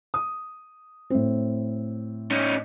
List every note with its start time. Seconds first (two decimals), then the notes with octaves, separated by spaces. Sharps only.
0.14 D#6
1.10 A2 C4
2.31 C#4 D#4